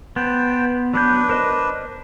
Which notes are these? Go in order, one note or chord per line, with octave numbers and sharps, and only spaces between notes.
B3 C5 G5 A5
F#3 B3 D4 B4 G6
A#4 C5 D#5